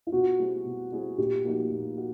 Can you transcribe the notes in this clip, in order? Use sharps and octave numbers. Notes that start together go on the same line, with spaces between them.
F4
B2 F#4
G3 C4 E4 G#4
B2
G3 C4 E4 G#4
A#2 G4
F3 A#3 D#4 F#4
A#2
F#4